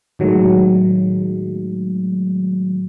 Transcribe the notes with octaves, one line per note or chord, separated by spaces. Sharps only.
A2 D#3 F#3 G#3 A3